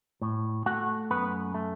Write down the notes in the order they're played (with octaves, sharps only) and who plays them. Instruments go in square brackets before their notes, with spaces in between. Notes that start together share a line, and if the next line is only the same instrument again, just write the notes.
[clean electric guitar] A2
A3 F#4 F#5
F#2 B3 B4
A3